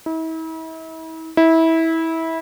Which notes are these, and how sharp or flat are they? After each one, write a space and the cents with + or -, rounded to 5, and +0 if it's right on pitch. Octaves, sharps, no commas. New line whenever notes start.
E4 -40
E4 -20